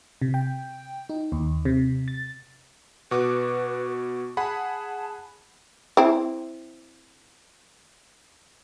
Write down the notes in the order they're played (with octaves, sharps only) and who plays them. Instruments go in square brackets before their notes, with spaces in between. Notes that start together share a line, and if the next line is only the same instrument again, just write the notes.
[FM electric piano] C3
G5
D#4
D#2
C3
A6
[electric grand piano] B2 F#4 D6 [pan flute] B4
[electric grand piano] G#4 F#5 B5 [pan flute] A5
[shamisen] C4 E4